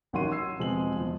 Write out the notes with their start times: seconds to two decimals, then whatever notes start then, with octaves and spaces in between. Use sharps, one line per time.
0.13 A1 D#3 F#3 F#5 C6 D#7
0.32 E6 G#6 C7
0.59 E1 F3 G#3 C4 B4 F#7
0.96 E2 F3